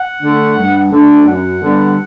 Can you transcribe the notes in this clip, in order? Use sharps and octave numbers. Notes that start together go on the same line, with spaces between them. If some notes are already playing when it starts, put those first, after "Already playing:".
Already playing: F#5
D3 A3 D4
G2
D3 A3 D4
F#2 F#5
D3 G3 B3